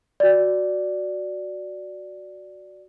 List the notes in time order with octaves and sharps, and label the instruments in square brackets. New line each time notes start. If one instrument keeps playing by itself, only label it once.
[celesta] F#4 D5